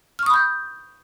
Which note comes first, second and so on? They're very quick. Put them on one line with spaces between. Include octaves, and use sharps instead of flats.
F6 C#6 D#6 B5 G6